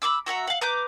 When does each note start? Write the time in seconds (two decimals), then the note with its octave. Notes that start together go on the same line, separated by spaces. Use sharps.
0.02 B5 C#6 D6 E6
0.26 F#4 E5 F#5 A#5
0.47 F5 F#5
0.61 B4 A#5 D6 G6